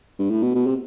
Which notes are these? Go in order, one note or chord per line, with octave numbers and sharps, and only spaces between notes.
G2
A2
B2
B2
C3